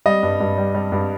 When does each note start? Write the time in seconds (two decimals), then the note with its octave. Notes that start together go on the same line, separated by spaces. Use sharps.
0.06 G3 D#5
0.23 G2
0.40 G2
0.58 G3
0.75 G3
0.92 G2